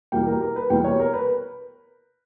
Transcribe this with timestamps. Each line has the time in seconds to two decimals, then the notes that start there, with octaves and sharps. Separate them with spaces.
0.12 E2 B2 G3 A#3 G5
0.26 A#4
0.41 A#4
0.56 B4
0.69 E2 B2 G3 A#3 G5
0.84 C#5
0.99 A#4
1.13 B4